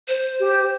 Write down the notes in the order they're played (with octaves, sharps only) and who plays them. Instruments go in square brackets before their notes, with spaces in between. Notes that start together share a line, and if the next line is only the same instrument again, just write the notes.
[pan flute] C5
[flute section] G4